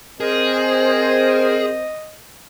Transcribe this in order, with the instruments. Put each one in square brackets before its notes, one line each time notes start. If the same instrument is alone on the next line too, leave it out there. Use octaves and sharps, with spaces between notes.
[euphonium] C4 [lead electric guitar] G#4 [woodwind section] A#4 C5 [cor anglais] D#5